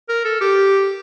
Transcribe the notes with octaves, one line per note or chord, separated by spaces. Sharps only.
A#4
A4
G4